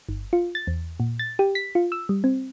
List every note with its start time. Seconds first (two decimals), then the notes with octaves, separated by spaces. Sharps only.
0.09 G1
0.33 F4
0.55 A6
0.67 E2
1.00 A#2
1.19 A6
1.39 G4
1.55 B6
1.75 F4
1.92 E6
2.09 G3
2.24 C4